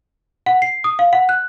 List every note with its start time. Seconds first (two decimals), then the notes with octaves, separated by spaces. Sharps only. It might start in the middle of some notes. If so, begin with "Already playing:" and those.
0.46 F#5
0.62 C7
0.84 D#6
0.99 F5
1.13 F#5
1.29 F#6